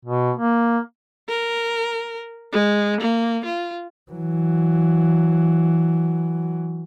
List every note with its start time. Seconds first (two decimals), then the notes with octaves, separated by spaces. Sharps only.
0.05 B2
0.36 A#3
1.29 A#4
2.52 G#3
3.01 A#3
3.45 F4
4.11 E3 F#3